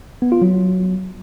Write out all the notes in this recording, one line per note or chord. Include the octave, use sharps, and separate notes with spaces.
B3
F4
F#3